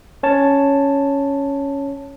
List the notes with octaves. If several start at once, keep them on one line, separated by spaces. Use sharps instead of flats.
C#4 C#5 A5